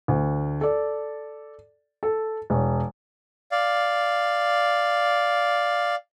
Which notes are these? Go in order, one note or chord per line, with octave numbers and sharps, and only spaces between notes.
D2
A4 D5
A4
E1 C#5
D5 F5